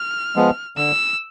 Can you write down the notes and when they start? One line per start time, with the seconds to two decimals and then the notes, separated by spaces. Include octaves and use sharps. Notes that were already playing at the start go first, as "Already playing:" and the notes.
Already playing: F6
0.36 F3 G#3 B3
0.77 D3 E6